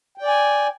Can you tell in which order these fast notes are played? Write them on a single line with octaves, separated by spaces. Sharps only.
G5 D5 G#5